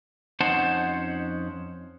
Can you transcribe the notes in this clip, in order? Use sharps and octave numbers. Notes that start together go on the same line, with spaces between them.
F2 C#4 D#4 C5 F#5 A5